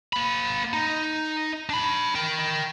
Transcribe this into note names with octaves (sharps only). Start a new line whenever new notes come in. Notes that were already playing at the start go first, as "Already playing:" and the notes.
A#3 B5
D#4
D4 B5
A#4 G5